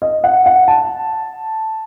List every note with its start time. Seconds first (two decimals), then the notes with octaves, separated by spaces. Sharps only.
0.02 D#5
0.24 F#5
0.46 F#5
0.68 A5